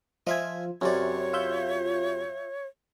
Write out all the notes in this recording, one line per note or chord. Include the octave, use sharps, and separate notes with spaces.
F3 F4 D#5 E5 G#5
F#2 C3 C#4 C#5 D5
F4 E5 G6